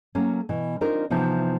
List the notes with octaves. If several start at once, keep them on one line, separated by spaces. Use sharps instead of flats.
F#3 A3 A#3 C#4
B2 E3
C4 D4 D#4 F4 A#4
C3 E3 F3 B3 D#4